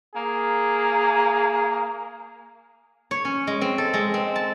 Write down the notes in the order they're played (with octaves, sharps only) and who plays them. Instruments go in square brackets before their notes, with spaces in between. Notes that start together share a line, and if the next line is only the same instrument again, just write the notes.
[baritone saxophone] A#3 [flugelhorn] G#4
[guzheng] C#5
C#4
G#3
C4
A4
G#3
C4
A5